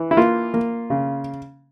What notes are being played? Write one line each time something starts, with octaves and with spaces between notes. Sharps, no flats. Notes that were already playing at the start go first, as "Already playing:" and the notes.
Already playing: E3
E4
A#3 F4
A#3
C#3